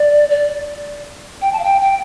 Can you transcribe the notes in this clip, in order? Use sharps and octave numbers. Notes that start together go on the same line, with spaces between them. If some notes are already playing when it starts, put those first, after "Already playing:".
Already playing: D5
D5
G5
A5
F5
G5
G5